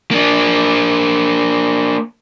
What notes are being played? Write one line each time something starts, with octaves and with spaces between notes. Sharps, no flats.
A#3 D4